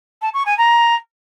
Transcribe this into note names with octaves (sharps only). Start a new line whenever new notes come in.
A5
C#6
G#5
A#5